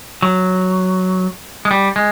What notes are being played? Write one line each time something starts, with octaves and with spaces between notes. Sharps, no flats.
F#3
G#3
G3
G#3